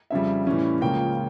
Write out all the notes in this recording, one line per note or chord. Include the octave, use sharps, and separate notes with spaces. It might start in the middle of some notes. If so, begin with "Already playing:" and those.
F2 C#3 G3 E5
A2 E3 G3 C#4
C#2 C#3 F3 A#3 C#4 G5
G5